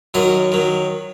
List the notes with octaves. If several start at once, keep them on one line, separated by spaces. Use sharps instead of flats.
F#2 D#3 F#3 D#5
D#3 F#3